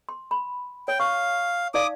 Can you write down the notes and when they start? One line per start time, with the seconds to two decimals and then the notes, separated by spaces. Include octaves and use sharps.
0.09 C6
0.31 B5
0.88 C#5 G5
1.00 F5 C#6
1.74 D#4 D5 F5 D6 D#6